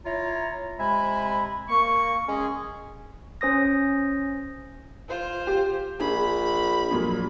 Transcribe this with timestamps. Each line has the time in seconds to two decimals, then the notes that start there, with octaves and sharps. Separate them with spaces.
0.05 E4 F4 C#5 A#5
0.79 C3 G#3 E5 G#5 B5
1.68 A#3 C#6
2.28 G#3 C#4 G#4
3.41 C#4 C5 D#6 A#6
5.09 F4 C5
5.47 G4
6.00 A#1 G#4 B5
6.91 F2 A#2 F#3